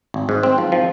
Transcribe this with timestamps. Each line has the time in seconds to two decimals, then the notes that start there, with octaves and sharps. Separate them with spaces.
0.14 G#1
0.29 G#2
0.43 C4
0.58 F3
0.72 F3